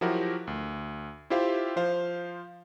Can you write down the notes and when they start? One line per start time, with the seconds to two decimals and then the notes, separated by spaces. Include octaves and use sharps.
0.01 F3 F#3 E4 F#4 G4 A#4
0.47 D2
1.30 E4 F4 G4 C5 E5 F5
1.76 F3 C5 F5